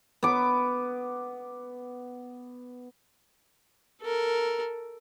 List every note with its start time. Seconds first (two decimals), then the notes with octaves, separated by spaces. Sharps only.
0.23 B3 D6
4.01 A4 A#4